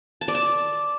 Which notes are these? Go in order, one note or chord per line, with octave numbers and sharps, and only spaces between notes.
A5
D5
A5